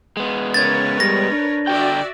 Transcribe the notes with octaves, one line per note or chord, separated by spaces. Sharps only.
G#3 B3
C#3 A#4 B4 C#5 G#6 A6
G3 A#6
D4
D3 F#4 D5 E5 G5